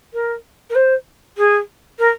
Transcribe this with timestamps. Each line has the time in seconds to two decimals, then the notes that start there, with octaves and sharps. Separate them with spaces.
0.14 A#4
0.70 A#4
0.75 C5
1.37 G#4
1.99 A#4